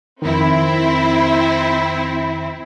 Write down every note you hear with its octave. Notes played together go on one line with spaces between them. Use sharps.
F2 D#3 C4 E4